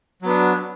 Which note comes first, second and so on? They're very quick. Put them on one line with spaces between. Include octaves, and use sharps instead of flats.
F#3 B3 D4